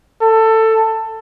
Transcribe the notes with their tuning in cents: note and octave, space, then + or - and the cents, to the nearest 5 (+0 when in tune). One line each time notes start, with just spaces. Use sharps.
A4 +15